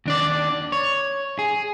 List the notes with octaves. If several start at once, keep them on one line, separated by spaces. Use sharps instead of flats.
D#2 D4 D5
C#5
G#4